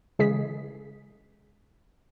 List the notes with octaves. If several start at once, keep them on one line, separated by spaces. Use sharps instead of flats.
C#3 E3 G#3 G#4 B6